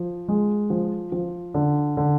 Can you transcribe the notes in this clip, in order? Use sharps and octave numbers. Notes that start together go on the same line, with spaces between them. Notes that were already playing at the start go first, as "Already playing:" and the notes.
Already playing: F3
G#3
F3
F3
D3
D3